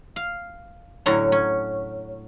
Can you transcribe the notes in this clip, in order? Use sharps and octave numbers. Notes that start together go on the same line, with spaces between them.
F5
A2 D3 F#3 C#4 A#5
C#4